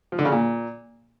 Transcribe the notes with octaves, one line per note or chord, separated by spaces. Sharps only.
F3
D3
C#3
A#2